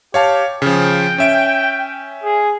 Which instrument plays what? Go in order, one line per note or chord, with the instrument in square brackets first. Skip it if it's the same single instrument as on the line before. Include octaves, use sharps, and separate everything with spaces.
[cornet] G4 [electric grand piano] C#5 F5 A5
[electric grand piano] C#3 F3 [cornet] G5
[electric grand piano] C#4 E5 D7
[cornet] G#4